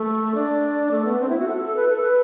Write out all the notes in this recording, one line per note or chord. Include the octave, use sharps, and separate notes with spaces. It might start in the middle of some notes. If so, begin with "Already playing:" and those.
Already playing: A3
D4
A3
B3
C4
E4
F#4
A4
A4
B4
A4
B4